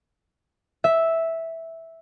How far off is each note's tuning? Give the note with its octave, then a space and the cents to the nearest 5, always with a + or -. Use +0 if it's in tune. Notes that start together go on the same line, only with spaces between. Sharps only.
E5 -5